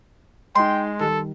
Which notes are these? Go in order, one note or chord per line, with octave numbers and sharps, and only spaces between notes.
G#3 D#4 D#5 G5 C6
D#3 G3 A4